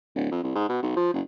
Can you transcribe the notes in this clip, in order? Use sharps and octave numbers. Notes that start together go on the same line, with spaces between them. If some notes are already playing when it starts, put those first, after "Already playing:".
D1
F2
C2
G#2
B2
B1
F3
F#1